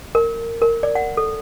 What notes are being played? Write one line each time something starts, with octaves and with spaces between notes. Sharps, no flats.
A#4
A#4
D5
F#5
A4